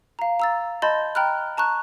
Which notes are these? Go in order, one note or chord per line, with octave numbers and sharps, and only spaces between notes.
F5 A#5
A#5 E6 A6
D#5 A5 B5 C6 G6 A6
G5 A#5 B5 F6 F#6
A5 A#5 C#6 F#6